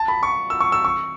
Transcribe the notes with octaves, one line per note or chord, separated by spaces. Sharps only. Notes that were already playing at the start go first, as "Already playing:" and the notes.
Already playing: A5
B5
C#6
E6
C#6
E6
C#6